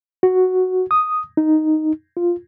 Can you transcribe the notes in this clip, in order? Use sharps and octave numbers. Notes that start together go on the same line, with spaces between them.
F#4
D#6
D#4
F4